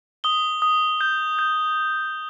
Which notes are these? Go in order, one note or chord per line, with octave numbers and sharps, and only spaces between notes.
D#6 G7
D#6
G6
G6